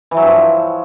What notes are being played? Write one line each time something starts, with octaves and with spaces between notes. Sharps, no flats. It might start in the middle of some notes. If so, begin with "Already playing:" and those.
E3
F#3
G2
F3